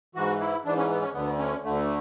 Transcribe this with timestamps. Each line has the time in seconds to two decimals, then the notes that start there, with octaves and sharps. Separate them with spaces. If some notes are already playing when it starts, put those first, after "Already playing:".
0.15 G#2 E3 F#4
0.40 E4
0.65 G#2 E3 D4
0.77 C#4
0.90 B3
1.01 C#4
1.14 D2 D3 B3
1.39 C#4
1.64 D2 D3 A3